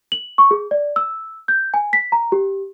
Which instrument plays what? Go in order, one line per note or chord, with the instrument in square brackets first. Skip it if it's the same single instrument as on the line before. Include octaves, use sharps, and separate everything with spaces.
[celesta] F#7
C#6
G#4
D5
E6
G6
G#5
B6
A#5
G4